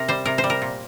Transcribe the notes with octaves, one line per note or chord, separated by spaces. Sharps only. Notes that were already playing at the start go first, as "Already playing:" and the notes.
Already playing: C3 A#4
G3 C5
C3 A#4
C5
G3
A#4
A#2